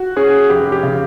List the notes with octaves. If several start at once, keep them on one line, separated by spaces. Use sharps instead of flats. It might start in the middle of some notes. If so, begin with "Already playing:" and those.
Already playing: F#4
C#4 G#4
F1 G4
G4
C#3